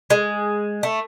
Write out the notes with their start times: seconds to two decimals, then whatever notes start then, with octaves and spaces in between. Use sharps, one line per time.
0.10 G#3
0.83 A3